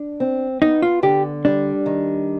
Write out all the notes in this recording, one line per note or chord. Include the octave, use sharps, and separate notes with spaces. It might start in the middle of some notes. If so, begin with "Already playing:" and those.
Already playing: D4
C4
B3 D#4
F4
D3 G4
G3 D4
D#3